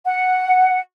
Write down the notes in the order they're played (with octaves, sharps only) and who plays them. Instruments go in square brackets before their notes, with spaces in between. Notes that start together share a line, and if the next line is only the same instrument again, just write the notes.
[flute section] F#5